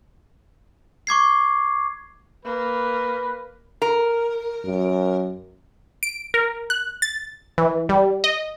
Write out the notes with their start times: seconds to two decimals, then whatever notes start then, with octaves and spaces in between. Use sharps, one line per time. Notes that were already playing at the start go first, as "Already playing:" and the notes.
1.07 C#6 D6 G#6 C7
2.45 A#3 B4
3.82 A#4
4.66 F#2
6.03 D7
6.34 A#4
6.70 F#6
7.02 A6
7.58 E3
7.89 G3
8.24 D#5